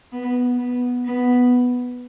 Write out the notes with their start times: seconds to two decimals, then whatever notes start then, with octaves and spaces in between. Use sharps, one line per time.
0.12 B3
0.58 B3
1.05 B3